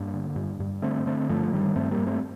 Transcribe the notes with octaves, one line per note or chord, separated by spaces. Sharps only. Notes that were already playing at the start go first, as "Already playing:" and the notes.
Already playing: G2 A#3 D4
D3
G2
G2
D3 A3 C4
D3 A3 C4
G2 F3 A3
G2 D#3 G3
G2 A3 C4
G3 A#3
G2
A3 C4